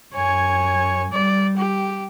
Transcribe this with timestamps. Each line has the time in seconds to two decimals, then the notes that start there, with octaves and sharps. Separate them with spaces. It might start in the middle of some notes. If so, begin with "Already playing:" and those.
0.14 F#2 C#5 G#5
1.13 G3 D5
1.57 G4